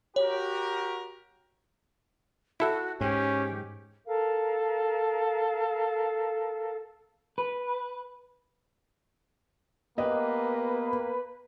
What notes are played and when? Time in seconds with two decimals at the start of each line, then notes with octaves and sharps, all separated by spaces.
0.16 F#4 G4 A#4 C#5
2.60 E4 F#4 A4 E5
3.01 G#2 C#4 G4
4.07 A4 A#4 F5
7.38 B4
9.98 A#3 B3 G4 B4 D#5